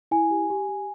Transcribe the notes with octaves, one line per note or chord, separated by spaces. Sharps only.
E4 G#5
G4
G4
G4